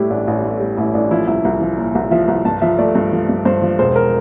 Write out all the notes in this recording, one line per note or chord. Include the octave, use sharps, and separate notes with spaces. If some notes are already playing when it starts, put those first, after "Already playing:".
Already playing: A2 G3 E4 G4
A1 D4
A1
A2
G3
A1 E4
A1 D4
F3 E4
C2 E4
C2
F3
A#2
C2
F3 E5
C2
G2 A5
F3 E5
A3 D5
G2
F3
G2
G2 C5
F3
E1 C5
A#4